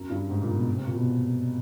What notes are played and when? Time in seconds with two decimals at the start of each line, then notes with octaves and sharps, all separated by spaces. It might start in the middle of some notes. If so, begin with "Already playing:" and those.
Already playing: F#2
0.10 G2
0.29 G#2
0.42 A#2
0.53 B2
0.75 C3
0.86 A#2
0.95 B2